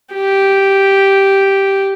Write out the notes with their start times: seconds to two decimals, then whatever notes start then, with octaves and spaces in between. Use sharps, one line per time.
0.14 G4